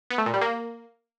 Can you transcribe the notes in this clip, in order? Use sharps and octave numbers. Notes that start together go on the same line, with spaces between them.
B3
A3
A#2
G3
A#3